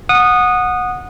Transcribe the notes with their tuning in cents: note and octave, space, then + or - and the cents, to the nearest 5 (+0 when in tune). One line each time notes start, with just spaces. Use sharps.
F#5 -20 D#6 -15